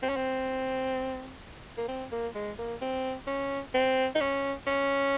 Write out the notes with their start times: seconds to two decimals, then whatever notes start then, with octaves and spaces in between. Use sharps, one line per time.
0.03 C4
0.09 C#4
0.17 C4
1.78 A#3
1.88 C4
2.12 A#3
2.35 G#3
2.59 A#3
2.81 C4
3.27 C#4
3.75 C4
4.16 D#4
4.21 C#4
4.67 C#4